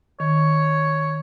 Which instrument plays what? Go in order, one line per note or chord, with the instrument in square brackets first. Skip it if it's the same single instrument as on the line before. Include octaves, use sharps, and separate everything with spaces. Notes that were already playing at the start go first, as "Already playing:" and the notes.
[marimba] D#3 [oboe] C#5